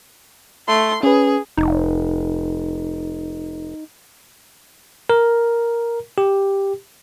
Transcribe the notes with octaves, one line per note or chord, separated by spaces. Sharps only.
A3 C6
C#4 G#4 B4
F1 D#4
A#4
G4